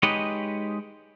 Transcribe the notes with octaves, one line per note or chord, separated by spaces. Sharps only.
G#3 D#4 G4 B4 C#5 D#5